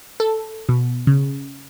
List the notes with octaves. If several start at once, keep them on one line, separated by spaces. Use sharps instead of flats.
A4
B2
C#3